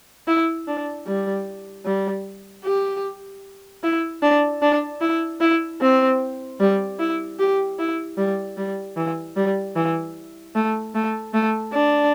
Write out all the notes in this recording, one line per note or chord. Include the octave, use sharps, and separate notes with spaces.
E4
D4
G3
G3
G4
E4
D4
D4
E4
E4
C4
G3
E4
G4
E4
G3
G3
E3
G3
E3
A3
A3
A3
D4